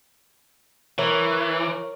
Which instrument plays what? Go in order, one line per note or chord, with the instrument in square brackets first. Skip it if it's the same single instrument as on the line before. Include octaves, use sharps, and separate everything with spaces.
[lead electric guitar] E3 [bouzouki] A#4 C#5